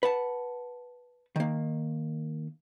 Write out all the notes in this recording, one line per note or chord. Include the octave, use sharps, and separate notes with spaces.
B4 F#5 A5
D#3 A#3